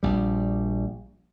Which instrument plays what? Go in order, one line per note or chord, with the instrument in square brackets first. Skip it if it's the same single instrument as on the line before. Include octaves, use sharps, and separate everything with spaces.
[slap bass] A#1 G3